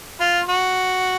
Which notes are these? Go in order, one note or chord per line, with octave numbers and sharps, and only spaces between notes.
F4
F#4